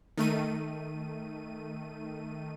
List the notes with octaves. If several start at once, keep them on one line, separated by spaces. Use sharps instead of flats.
D#3 A3 D#7